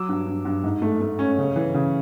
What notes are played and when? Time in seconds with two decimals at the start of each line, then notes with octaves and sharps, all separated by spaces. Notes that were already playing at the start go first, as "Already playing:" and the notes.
Already playing: F#3 D6 E6
0.09 G2
0.26 G2
0.45 G2
0.64 G#2
0.82 A3
1.01 A3
1.19 C#4
1.38 C#3
1.56 E3
1.74 C#3